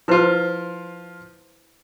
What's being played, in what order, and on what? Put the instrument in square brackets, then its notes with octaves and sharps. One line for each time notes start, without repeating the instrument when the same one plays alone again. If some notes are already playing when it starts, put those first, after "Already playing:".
[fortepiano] F3 F4 [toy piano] E4 B4 C5